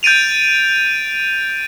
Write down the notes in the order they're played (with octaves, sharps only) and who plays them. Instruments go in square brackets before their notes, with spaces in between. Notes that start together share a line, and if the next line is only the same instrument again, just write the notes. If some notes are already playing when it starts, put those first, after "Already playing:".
[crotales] G6 A6 D7 D#7 F7